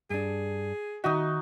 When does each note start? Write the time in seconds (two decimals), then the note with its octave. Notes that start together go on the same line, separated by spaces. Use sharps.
0.10 G2 D4 G#4
1.04 D#3 D#4 F#4 D#5 E5